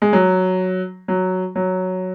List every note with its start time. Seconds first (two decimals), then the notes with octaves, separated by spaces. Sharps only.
0.02 G#3
0.13 F#3
1.08 F#3
1.56 F#3